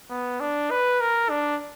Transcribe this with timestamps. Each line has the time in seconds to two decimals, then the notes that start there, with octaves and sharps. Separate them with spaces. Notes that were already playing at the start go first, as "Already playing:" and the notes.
0.10 B3
0.41 D4
0.71 B4
1.01 A#4
1.30 D4